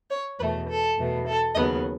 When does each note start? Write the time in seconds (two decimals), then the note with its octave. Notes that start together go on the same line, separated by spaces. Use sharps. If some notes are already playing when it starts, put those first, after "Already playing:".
0.11 C#5
0.39 E2 B2 A3 B4
0.69 A4
0.98 E2 B2 A3
1.27 A4
1.55 D#2 C#3 F#3 B3 D#5